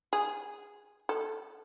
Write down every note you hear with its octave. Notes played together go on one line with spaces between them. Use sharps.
G#4
A4